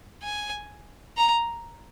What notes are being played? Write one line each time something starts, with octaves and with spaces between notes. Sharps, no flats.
G#5
A#5